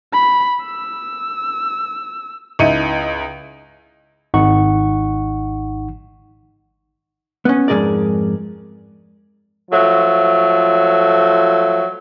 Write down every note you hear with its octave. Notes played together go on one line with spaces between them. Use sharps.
B5
E6
C#2 D#4 E4 C#7 D#7
G#1 D#4 F#5 C#6
B3 C#4
F2 G#2 B2 G#4 A#4 D5
F3 F#3 A3